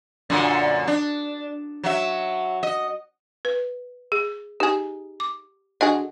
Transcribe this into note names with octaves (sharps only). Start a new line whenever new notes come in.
F#2 A#2 D3
D4
F#3 E5
D#5
B4
G#4
D#4 G4 G#4
D6
D3 F#4 G#4 D#5 F#5